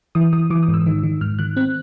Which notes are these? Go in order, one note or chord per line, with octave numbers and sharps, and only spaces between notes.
E3 D#6
E3 D#6
E3 D6
D#6
G#2
E6
D#3
D#3
G#2 F6
D#3 F#6
C4 F#6